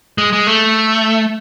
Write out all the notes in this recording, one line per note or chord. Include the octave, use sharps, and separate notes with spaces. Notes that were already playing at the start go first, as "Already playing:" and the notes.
G#3
G#3
A3